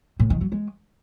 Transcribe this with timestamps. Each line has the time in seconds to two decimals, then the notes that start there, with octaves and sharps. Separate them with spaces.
0.19 A2
0.30 D#3
0.41 F#3
0.52 G#3